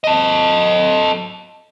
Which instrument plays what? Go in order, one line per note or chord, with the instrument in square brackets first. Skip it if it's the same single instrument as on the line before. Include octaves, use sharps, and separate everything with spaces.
[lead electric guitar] A4 D#5